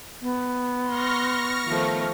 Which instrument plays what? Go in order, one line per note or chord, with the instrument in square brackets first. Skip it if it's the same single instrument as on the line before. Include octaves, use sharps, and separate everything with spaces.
[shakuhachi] B3
[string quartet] C6 [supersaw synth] C#6 F6 A#6
[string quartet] D#3 F3 A3